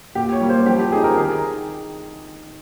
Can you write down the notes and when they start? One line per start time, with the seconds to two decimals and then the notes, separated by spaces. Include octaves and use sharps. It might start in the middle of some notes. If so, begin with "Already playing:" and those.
0.15 A#2 G4
0.32 C#5
0.41 G3 A#3
0.49 C5
0.66 F3 G4
0.80 G4
0.91 C4 D#4 G#4
1.04 A#4
1.17 D#3 G#4